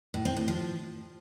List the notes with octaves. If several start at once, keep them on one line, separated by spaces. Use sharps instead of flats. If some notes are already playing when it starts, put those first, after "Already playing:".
A2
C4
A2
F3